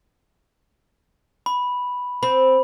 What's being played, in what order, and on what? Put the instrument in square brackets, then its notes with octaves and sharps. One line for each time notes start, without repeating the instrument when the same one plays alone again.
[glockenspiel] B5
[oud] C4 [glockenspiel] B5